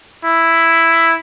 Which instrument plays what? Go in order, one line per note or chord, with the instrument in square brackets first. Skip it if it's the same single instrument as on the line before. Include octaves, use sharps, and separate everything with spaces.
[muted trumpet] E4